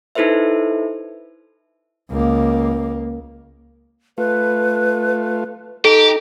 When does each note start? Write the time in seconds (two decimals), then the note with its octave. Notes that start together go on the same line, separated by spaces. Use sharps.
0.15 D#4 E4 A4 B4 C5 E5
2.11 C#2 A#3
4.18 A3 F4 B4
5.85 D#4 G4 A4 A#5